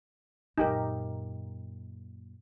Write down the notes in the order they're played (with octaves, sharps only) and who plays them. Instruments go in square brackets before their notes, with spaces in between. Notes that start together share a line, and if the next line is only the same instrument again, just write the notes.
[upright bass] F#2 A#2 [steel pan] D#4 G4 A#4